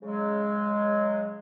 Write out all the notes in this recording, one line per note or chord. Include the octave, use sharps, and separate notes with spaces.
C#3 F#3 G#3